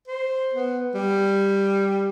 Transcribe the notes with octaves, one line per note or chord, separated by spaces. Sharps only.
C5
B3
G3